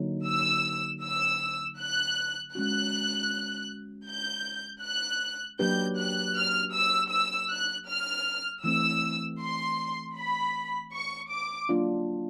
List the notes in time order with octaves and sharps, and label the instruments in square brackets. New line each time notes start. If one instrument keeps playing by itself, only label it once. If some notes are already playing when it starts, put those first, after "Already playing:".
Already playing: [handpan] D3 F#3 A#3 D#4
[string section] E6
E6
F#6
[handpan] G#3 C#4 F#4 [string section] F#6
[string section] G6
F#6
[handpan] F#3 A#3 D4 G4 B4 [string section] G6
[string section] F#6
F6
E6
E6
F#6
F6
[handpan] E3 A3 C4 [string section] E6
[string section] C6
B5
C#6
D6
[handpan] F#3 A#3 D4 F4